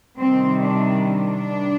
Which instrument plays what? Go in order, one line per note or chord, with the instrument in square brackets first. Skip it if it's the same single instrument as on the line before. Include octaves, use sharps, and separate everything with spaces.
[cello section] C3 D#3 G3 C4
D4
D4